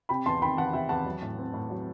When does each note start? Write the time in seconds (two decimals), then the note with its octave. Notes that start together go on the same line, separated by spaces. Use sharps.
0.09 C3 G5 B5
0.26 E2 A5 C6
0.42 D#3 G5 B5
0.57 E2 F#5 A5
0.73 C3 E5 G5
0.89 E2 F#5 A5
1.06 F#3
1.22 A2
1.38 C4
1.53 A2
1.70 F#3